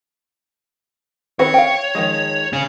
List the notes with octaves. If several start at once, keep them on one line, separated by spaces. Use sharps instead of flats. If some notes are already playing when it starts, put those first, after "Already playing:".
D#3 C4 B4 C#5
F5 G5
D#3 F3 G#3
C#4 G#4